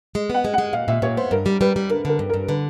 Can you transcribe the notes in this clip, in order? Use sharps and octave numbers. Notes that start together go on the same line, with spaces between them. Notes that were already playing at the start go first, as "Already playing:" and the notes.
G#3
B3 F#5
G#3
F#5
G#3
A#2 F5
A#2 E5
A#2 C#5
B3 C5
G2 A#4
G3
G3 B4
G3
D3 A#4
D3 A#4
G2
A#4
G2
D3 B4